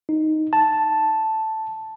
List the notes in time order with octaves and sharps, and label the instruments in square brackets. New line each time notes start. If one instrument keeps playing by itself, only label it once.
[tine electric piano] D#4
A5